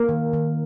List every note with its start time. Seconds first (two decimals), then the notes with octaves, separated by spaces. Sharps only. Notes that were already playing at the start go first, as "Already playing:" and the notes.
Already playing: A#3 A#4
0.09 D#3
0.33 D#3